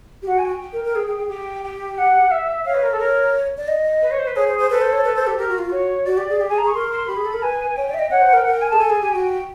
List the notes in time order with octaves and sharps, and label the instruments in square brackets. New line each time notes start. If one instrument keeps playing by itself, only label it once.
[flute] G4
[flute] F#4 [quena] F#5
[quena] G#5
G5
[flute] A#4
A#4
G#4
G#4
G#4
[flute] G4 [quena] G5
[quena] G5
F#5
E5
[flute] C#5 [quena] F5
[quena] B4
A#4
A4
[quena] A#4 [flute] C#5
[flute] D5
D#5
[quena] B4
C#5
C5
B4
[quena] G#4 [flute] C#5
[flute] C5
C5
[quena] A4 [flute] B4
[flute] C5
C#5
B4
C5
G4
[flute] G4 [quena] A#4
[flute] F#4
F4
[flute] F#4 [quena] C#5
[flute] F#4 [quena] D5
[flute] G4
G#4
[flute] G4 [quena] G5
[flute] G#4 [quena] G#5
[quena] A#5
[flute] G#4
[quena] C#6
[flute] A#4 [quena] C6
[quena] C6
[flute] G4 [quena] B5
[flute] G#4
A4
A#4
[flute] B4 [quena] G#5
[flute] C#5 [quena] G5
[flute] D5
E5
D#5
[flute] C#5 [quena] F#5
[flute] C5
A#4
[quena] G5
[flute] A#4 [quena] F#5
[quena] G5
G#5
A5
[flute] G#4
[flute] A4 [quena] G#5
[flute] G#4
G4
[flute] F#4 [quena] G5